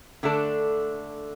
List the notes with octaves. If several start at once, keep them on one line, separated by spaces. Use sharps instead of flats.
D3 A3 D4 A4